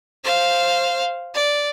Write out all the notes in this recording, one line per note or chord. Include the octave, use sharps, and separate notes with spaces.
C5 F5
D5